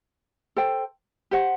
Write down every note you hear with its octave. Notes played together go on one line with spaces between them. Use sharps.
A4 C5 G5
G4 C5 F#5